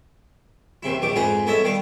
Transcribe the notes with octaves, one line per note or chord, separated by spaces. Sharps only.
D#2 C3 E4
A#1 D#2 D#3 D6
F2 G#2 D#4 G#4 B4
B3 E4 A4 C#5 D#5 E5
D#3 G3 F5